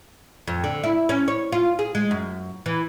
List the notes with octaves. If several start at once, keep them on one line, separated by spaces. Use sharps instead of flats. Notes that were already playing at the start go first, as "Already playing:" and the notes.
F2
D3
E4
C#4
C#5
F4
G#4
G#3
F#2
E3